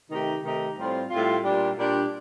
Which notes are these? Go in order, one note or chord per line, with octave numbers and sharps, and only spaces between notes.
C3 D#3 A3 D#4 G4
C3 D#3 A3 D#4 G4
A2 G3 C4 F4
A2 G3 C4 F4
A#2 G3 D4 G4
A#2 G3 D4 G4